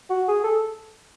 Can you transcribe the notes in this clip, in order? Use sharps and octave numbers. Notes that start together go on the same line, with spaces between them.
F#4
G#4
A4